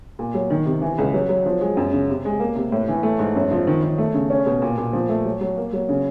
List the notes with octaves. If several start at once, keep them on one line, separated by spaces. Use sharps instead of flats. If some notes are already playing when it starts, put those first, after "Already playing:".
A#2
F#3
D#3
C3
E3
C#2
F#3
F#3
F3
G#3
F#2
C#3
C3
G#3
A#3
C3
A2
E3
A3
G#2
F#2
F3
D#3
D#3
A3
C#3
C#4
B2
A#2
A#2
F3
A3
F#3
F#3
A#3
F#3
C#3